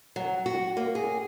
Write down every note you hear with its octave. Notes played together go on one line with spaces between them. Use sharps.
F#3
F#4
A#3
G#4